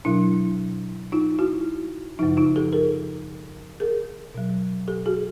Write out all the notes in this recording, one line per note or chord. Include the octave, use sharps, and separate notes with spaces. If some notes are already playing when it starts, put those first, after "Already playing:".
B2 F#3 D4 E4
D#4 F4
E4 F#4
F#2 C#3 F3 D#4
D#4 F4
G4 A4
G#4 A#4
G#4 A#4
B2 F#3
G4 A4
F#4 G#4